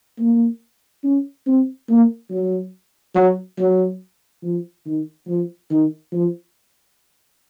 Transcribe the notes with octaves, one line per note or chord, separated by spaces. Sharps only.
A#3
C#4
C4
A#3
F#3
F#3
F#3
F3
D#3
F3
D#3
F3